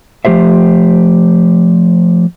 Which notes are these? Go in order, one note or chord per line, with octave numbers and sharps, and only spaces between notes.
F3 A3 G4 C5 E5